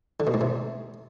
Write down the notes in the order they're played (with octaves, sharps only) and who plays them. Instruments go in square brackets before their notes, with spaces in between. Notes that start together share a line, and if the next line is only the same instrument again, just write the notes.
[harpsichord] D3
B2
G#2
C3